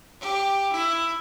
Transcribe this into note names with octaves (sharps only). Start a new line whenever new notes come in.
G4
E4